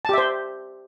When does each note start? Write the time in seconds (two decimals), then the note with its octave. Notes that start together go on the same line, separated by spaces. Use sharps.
0.05 A5
0.09 G4
0.13 E5
0.18 C5